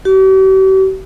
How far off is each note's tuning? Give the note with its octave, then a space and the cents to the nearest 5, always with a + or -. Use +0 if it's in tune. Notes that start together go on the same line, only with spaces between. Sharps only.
G4 -45